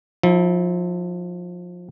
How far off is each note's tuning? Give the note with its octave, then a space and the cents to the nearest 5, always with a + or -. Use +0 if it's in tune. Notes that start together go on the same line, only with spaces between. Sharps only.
F3 +25 E4 -25